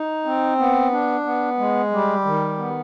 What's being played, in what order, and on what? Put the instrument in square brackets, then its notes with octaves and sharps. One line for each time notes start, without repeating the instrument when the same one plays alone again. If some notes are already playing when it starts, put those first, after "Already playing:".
Already playing: [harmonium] D#4
C4
B3
D4
B3
G#3
G3
D#3
B3